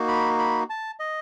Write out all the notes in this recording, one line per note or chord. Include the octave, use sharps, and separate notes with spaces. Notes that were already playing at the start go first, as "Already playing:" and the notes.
Already playing: A#3 D#4 F#4
B5
B5
A5
D#5